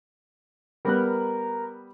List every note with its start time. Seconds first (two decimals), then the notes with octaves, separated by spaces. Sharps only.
0.85 G3 B3 A#4 F#6